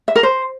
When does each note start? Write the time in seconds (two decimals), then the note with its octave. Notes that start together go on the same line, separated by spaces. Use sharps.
0.08 E5
0.16 A#4
0.23 C5